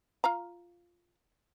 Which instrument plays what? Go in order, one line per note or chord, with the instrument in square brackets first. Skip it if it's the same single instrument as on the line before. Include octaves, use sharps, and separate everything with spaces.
[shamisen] F4 F5 A#5